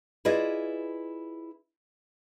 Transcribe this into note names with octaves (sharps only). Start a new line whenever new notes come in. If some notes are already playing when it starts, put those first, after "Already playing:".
E4 F4 G#4 B4 D5 D#5